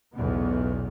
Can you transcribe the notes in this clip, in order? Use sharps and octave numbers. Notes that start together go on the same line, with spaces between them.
B1 E2 A2 C#3 B3